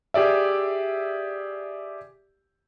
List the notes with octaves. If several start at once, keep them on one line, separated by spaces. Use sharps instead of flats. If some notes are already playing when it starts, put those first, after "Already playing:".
G4 G#4 D5 E5